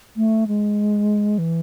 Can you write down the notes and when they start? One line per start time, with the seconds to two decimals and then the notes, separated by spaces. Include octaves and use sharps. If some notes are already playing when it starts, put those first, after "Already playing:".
0.16 A3
0.47 G#3
1.38 E3